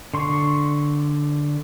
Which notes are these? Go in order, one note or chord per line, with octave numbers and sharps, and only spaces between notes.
D3 C6 C#6